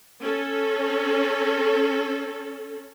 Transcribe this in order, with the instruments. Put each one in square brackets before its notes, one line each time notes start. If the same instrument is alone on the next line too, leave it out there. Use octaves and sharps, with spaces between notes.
[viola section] C#4 A4